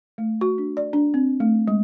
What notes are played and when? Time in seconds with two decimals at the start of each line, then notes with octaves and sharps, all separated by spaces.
0.18 A3
0.41 F#4
0.58 D4
0.77 D5
0.93 D4
1.14 C4
1.40 A3
1.68 G#3